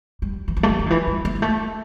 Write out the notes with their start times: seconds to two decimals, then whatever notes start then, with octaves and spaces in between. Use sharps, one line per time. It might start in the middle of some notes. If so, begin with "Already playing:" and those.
0.22 G3
0.48 E3
0.57 F3
0.63 A3
0.68 G3
0.79 F3
0.86 D3
0.90 E3
1.07 G3
1.25 A#3
1.36 G3
1.42 A3